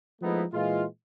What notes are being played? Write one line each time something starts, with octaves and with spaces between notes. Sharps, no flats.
F3 G#3 A3 B3 D#4 E4
A#2 E3 G#3 F4